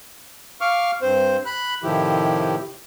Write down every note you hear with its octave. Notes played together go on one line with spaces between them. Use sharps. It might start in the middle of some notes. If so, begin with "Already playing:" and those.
F5 C#6 D6 F6
G2 C4 C5
B5 F#6
A2 C3 D#3 F3 E4 G4